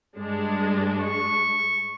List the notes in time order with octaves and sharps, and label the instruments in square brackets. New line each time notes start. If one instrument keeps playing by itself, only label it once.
[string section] G2 G#3 D4
[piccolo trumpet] C#6